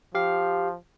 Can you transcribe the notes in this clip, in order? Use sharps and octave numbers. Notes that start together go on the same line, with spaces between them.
F3 G4 F5